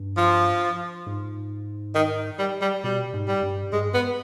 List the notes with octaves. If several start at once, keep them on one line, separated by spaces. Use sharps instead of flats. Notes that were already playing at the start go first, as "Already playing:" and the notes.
Already playing: G2
F3
G#2
D#3
G3
G3
B2 G3
G#2
G3
G2
G2 G#3
G#2
G2
B3